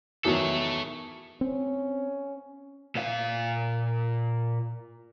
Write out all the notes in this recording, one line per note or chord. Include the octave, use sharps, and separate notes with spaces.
E2 D#3 F#3 A4 C#5
C4 C#4
A#2 F5